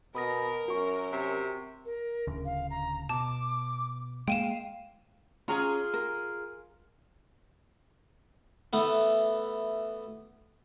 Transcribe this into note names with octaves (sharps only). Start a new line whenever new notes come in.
B2 A#4 B5 D#6 A#6
F#2 F#4 C#6
C3
A#4
D1 D2 C#3
F5
A#5
B2 A5 D6
G#3 A#3 F5 G5 D#7 E7
C#4 F4 G#4 A#5
A#4
E3 A3 B3